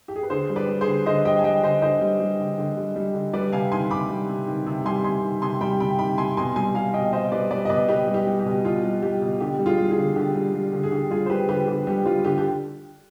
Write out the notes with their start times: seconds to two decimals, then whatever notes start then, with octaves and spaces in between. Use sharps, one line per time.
0.08 G4
0.16 G#4
0.23 B4
0.30 D3 G#4 C5
0.50 G3
0.56 B4 D5
0.68 G3
0.81 G#4 C5
0.87 D3
1.06 D3 C5 D#5
1.25 G3 D#5 G5
1.39 G#5
1.44 G3 D#5 G5
1.63 D3 C5 D#5
1.82 D3 C5 D#5
2.01 G3
2.20 G3
2.39 D3
2.58 D3
2.77 G3
2.96 G3
3.15 D3
3.33 G3 B4 D5
3.52 C3 F5 G#5
3.72 D#3 G#5 C6
3.90 C3 B5 D6
4.09 G3
4.29 C3
4.47 D#3
4.66 C3
4.85 G3 G#5 C6
5.04 C3 G#5 C6
5.23 D#3
5.42 C3 G#5 C6
5.61 G3 G5 B5
5.80 C3 G5 B5
5.99 D#3 G5 B5
6.18 C3 G#5 C6
6.37 B2 G#5 C6
6.56 G3 G#5 C6
6.75 G3 F5 G#5
6.94 B2 D#5 G5
7.13 B2 C5 D#5
7.32 G3 B4 D5
7.51 G3 B4 D5
7.65 D#5
7.70 B2 B4 D5
7.88 B2 G4 B4
8.08 G3
8.14 G4
8.27 G3
8.39 G4
8.45 B2
8.64 B2 F4
8.83 G3
9.02 G3 G4
9.21 B2
9.40 D3 G4
9.59 G3
9.66 F4 G#4
9.78 G3
9.91 F4 G#4
9.97 D3
10.16 D3 G4
10.35 G3
10.55 G3
10.73 D3
10.83 G#4
10.92 D3 G4
11.11 G3 F4 G#4
11.26 C5
11.30 G3 G4 B4
11.48 D3 G4 B4
11.68 D3 G4
11.87 G3 G4
12.06 G3 F4
12.24 D3 G4
12.38 G4